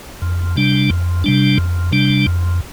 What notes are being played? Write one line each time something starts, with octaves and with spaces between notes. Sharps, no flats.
F2
C3 G3 D4
F2
C3 G3 D4
F2
C3 G3 D4
F2